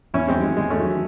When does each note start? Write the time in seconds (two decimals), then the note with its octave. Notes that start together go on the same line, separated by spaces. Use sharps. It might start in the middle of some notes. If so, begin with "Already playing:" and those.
0.14 E2 C#4 E4
0.28 G#3 C4
0.35 D#3 F#3
0.42 G#3
0.57 E2 G#3
0.70 A3 C#4
0.77 D#3 F#3